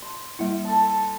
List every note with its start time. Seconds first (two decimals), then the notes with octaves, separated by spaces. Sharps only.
0.02 C6
0.39 G3 A#3 E4
0.65 A4 A5